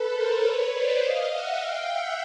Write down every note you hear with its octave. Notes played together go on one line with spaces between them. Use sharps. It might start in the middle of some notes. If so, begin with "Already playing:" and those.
Already playing: A4 B4
A#4 C5
B4 C#5
C5 D5
D#5 F5
E5 F#5
F5 G5
E5 F#5